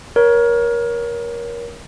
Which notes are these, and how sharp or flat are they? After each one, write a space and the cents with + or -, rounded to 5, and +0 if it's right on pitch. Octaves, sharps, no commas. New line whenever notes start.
A#4 +25 C#5 +10